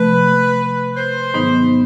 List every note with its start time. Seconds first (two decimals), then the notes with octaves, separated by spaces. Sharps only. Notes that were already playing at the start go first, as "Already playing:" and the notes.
Already playing: C3 F3 A3 B4
0.96 C5
1.34 G#2 D#3 F#3 B3 D#4